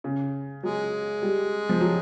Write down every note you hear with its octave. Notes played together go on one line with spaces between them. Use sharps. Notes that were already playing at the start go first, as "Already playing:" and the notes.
C#3
F#3 G#3
G3
F3
F#3